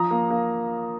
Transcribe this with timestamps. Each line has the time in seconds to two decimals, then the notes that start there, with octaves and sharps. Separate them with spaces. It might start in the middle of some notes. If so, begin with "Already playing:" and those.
Already playing: F3 A#5 D#6
0.11 A#3
0.30 A#3